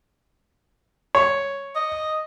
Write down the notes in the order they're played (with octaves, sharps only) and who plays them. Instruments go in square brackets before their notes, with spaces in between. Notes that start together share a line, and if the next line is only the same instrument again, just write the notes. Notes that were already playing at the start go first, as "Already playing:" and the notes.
[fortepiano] C#5
[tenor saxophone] D#5